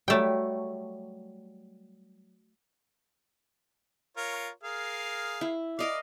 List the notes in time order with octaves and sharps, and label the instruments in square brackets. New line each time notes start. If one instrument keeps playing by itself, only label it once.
[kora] F#3 G3 [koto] A3 G5
[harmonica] F4 A#4 C#5
G#4 A#4 F5
[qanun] E4
[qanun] A#4 D#5 F5 [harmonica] D5